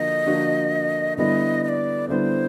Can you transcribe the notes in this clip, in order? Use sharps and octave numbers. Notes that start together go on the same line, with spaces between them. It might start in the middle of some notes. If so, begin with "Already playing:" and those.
Already playing: D3 F3 A#3 D4 F#4 D#5
D3 F3 A#3 D4 F#4
D3 G3 B3 E4 D#5
D#5
D5
D3 G3 B3 E4 C5